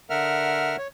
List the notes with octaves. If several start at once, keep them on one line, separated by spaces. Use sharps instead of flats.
D3 A#4 E5 F#5 F6
C#5